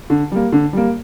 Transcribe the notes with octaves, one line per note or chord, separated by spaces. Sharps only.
D3
G3 A#3
D3
G3 A#3